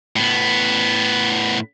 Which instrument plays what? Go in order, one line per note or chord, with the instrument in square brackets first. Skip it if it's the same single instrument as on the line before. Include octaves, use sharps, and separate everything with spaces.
[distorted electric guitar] A2 B3